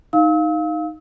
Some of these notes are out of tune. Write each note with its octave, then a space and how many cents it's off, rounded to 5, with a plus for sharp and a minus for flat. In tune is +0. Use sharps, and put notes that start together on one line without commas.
D#4 +0 F5 +5 E6 -40